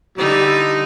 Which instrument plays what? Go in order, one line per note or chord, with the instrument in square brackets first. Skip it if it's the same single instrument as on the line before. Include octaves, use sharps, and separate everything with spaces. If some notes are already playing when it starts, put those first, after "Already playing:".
[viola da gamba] D3 D#4 E4 [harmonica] G3